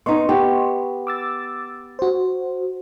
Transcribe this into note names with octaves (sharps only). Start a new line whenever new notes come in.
B3 D#4 D#5 C6 C#6
B3 G4
D6 E6 A6
F#4 C5